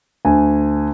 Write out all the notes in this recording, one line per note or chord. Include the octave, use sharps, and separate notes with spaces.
D2 G#5